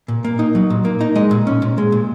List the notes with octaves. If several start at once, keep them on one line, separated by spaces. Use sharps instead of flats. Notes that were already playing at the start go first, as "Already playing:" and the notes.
A#2
A#3
D#4
F#3
A#2
A#3
D#4
G#3 D#5
A#2
C#4
A#2
G#3
A#2